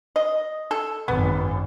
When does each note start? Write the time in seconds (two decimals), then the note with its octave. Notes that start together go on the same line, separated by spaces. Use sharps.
0.16 D#5
0.71 A4
1.08 G#1 F#2 B3